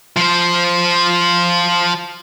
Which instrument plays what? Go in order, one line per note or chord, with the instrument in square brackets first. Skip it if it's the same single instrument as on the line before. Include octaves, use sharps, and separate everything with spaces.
[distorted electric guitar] F3 C5